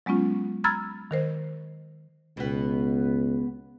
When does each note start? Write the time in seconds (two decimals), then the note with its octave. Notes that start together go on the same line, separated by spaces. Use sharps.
0.06 F#3 G#3 B3 C#4 F4
0.64 A#5 B5 E6 F6 G#6 A6
1.11 D#3 A#4 C5
2.37 C#2 B2 B3